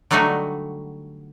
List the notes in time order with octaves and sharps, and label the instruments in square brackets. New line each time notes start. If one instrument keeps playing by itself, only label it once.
[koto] D3 F#3 G3 A3 D#4 F#4